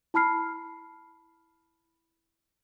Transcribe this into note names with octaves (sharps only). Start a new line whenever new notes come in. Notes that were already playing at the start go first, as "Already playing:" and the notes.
E4 A5 B5 F6 C7